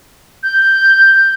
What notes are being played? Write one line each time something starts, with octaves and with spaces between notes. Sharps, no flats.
G6